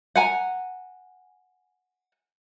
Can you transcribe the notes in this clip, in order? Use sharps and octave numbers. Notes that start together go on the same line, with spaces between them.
F#5 G#5 A#5